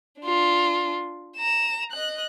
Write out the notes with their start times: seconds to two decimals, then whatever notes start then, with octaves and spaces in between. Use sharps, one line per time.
0.21 D4 F4
1.37 A#5 E7
1.92 D#5 F#6